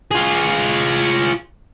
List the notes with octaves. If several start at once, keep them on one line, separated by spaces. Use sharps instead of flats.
F4 G#4